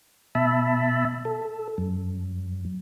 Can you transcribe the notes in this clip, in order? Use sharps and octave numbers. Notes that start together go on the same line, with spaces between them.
B2 E5 A5 B5
A4
F#2